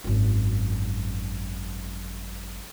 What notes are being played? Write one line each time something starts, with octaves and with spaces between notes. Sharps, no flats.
G#1 F#2